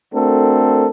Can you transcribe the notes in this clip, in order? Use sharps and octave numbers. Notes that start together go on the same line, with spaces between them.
A3 C4 D4 F#4 A4 A#4